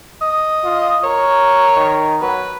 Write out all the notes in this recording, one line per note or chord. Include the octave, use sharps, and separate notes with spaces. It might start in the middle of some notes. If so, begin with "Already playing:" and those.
D#5
F4
A#4 C#5
D#3
F#3 B4